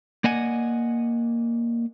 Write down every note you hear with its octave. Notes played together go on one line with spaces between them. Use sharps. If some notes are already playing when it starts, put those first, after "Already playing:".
A#3 D5 D#5 F#5 G#5